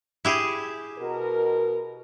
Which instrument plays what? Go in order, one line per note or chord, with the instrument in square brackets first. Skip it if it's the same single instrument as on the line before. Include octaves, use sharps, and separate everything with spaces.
[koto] E4 G4 G#4
[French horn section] B2 A#4